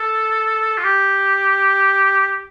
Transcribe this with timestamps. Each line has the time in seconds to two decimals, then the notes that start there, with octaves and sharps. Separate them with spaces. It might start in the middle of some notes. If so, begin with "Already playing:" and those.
Already playing: A4
0.78 F4
0.84 G4